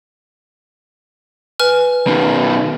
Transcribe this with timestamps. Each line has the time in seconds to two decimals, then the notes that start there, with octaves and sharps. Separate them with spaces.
1.60 B4 G#5 F6
2.07 B2 D#3